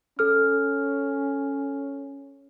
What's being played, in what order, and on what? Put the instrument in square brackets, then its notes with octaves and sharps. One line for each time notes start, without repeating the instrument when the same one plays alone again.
[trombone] C#4 [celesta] A4 F6